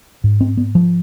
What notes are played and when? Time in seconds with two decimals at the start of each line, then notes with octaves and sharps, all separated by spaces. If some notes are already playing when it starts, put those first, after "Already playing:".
0.24 G#2
0.41 C4
0.57 B3
0.75 F3